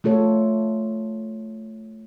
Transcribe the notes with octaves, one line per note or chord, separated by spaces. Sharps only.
A3 F4 A4 C#5